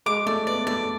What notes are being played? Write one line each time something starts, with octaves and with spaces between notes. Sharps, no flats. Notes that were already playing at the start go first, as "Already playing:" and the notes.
G#3 D6
A3 D5
B3 D5
A3 D5